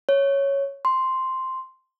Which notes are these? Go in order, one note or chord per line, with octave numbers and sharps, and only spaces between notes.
C#5
C6